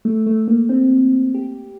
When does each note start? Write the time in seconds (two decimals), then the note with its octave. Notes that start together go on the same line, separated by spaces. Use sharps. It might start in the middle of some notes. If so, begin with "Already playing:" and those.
0.05 A3
0.26 A3
0.48 A#3
0.69 C4
1.34 G4